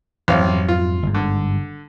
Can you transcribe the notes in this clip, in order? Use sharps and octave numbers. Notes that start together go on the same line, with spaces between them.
A1 F2 G#2 F#3 C4 F5
F4
G1 G#2
D3